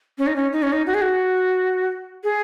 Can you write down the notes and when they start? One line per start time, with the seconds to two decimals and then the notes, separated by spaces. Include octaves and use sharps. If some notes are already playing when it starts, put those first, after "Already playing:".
0.18 C#4
0.27 D#4
0.36 C#4
0.52 D#4
0.63 C#4
0.72 D#4
0.87 F#4
0.94 G#4
1.02 F#4
2.24 G#4